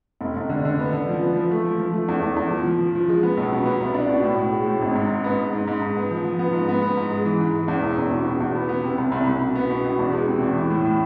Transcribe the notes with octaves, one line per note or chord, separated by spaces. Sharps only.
F1
F1
D3
D3
B3
D3
F3
B3
F3
A3
F3
F3
A3
E2
E2
E2
F3
F3
F3
F3
G#3
B3
B1
B2
B3
C2
D4
B2
A2
A2
G#3
A2
G#1
G#2
G#2
B3
G#2
G#2
G#2
G#2
B3
F3
F3
B3
G#2
B3
B3
G#2
G#3
E3
G#2
G#3
E2
E1
E2
B2
B2
E2
B3
B3
C3
C2
C2
C2
B2
B3
B2
B2
E2
G#3
C3
E2
E3
A2
A2